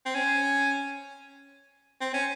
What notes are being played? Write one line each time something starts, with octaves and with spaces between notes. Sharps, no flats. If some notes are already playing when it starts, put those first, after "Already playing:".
C4
C#4
C4
C#4